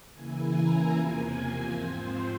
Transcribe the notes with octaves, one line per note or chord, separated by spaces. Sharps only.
C#3 E3 A#3 E4 G#5
A#5
E2 C3 F3 A#3 G#5
G#5
G#2 F3 C4 C5